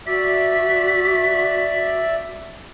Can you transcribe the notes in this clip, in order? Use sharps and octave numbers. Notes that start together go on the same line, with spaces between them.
F#4 D5 E5 B6